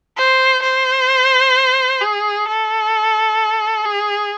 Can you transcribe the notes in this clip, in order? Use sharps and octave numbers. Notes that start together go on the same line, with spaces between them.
C5
C5
G#4
A4
G#4